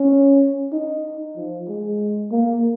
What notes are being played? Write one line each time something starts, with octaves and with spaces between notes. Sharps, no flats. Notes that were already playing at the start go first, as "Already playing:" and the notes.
Already playing: C#4
D#4
F3
G#3
A#3